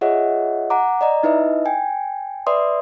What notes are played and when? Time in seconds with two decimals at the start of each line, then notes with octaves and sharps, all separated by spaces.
0.01 F4 G#4 C#5 D#5 E5 F#5
0.70 F#5 A#5 D6
1.01 D5 D#5 A#5
1.23 D#4 E4 B4 D#5 E5
1.65 G5 G#5
2.47 B4 D5 E5 C6 D#6